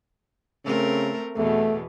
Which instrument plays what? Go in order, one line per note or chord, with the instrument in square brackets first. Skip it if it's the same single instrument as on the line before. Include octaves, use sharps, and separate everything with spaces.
[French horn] C#3 [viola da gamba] A3 C4 A#4
[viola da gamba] E2 B2 [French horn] A3